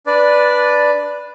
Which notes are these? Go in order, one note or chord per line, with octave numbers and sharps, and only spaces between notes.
D4 B4 D5